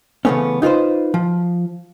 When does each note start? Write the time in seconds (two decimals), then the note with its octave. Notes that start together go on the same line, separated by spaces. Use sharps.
0.25 C#3 E3 F3 A3 B3 C#4
0.62 D#4 F4 G#4 B4 C5
1.14 F3